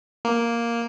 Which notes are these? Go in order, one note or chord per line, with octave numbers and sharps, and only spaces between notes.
A#3